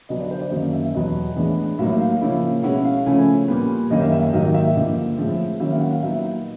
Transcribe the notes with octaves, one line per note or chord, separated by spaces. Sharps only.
D3 F#3 B3 D4 D#5
D5
C5
D5
F#2 D#3 F#3 A#3 D#5
E5
E2 B2 F#3 B3 D#5
A2 E3 G#3 B3 D4
A2 F#3 A#3 D#4 E5
F5
C#3 F3 A#3 C#4 E4
B2 G#3 C#4 E4 F#5
F5
C#3 F3 A3 C#4 E4 G#5
A#2 G3 B3
F#2 D#3 G3 A#3 C#4 D#5
E5
E5
E5
G#2 D#3 F#3 A#3 D#4 D#5
E5
G2 D3 F3 A#3
A2 F3 G#3 C4
D#3 F#3 A#3 C#4 E4 E5
F5
F#5
F5
A#2 F#3 B3 D#4 E5